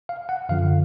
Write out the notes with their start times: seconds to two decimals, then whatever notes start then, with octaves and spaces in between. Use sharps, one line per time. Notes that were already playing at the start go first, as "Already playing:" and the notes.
0.09 F5
0.29 F#5
0.49 F#2 D3 F3 F5